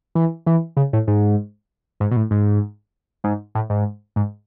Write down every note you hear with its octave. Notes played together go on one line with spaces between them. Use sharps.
E3
E3
C#3
A2
G#2
G#2
B2
A2
G#2
G#2
A2
G#2
G#2